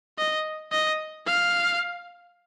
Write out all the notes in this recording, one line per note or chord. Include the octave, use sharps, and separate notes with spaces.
D#5
D#5
F5